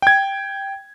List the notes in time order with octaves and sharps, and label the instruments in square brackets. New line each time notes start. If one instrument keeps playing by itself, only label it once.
[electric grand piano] G5 G#6